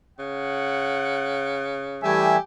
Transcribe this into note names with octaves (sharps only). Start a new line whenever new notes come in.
C#3 F#5
E3 G3 A3 G4 E5 G#5